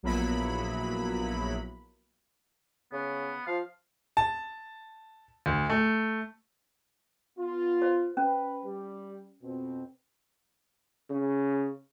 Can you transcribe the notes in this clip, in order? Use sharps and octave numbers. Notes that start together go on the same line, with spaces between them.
A#1 F#3 A#3 B3 E4 B5
C#3 B3
F3 F5
A5
D2
A3
B3 F4
C5
C#4 B4
G3
F2 B2 C4
C#3